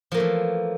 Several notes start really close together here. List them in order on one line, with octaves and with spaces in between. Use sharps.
F3 A#3 A3 E3